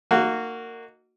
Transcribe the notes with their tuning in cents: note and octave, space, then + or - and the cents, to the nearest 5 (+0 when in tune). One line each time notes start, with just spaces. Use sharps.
A#3 -20 D#4 +0 F#4 -5